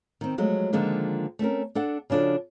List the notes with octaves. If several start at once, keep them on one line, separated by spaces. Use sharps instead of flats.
D#3 C4
F3 F#3 G#3 A3
D3 D#3 F3 G#3 A#3
A3 C4 C#4 A#4
D4 A4 F#5
C#3 F3 D4 F#4 A4